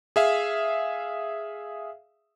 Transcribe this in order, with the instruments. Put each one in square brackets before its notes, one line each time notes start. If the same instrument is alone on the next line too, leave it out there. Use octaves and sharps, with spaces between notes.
[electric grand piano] G#4 E5 F5